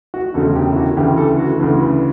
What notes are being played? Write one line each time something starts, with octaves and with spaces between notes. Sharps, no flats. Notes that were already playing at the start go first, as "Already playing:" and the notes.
F#4
E1 D2 C#3 A4
G4
E4
F#4
D2 C#3 E3 G4
A4
F#4
D2 C#3 E3 A4
B4